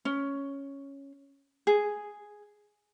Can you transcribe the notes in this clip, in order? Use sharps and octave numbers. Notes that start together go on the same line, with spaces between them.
C#4
G#4